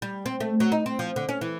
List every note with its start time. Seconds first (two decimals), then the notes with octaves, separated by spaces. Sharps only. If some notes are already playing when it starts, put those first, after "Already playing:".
0.02 G3
0.26 C4
0.40 A3
0.60 F#3
0.72 D#4
0.86 C4
0.99 F3
1.16 D3
1.29 C#4
1.41 E3